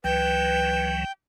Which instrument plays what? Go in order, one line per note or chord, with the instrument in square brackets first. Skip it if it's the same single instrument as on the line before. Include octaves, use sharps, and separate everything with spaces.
[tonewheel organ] C#2 E3 F#3 [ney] B4 [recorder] G5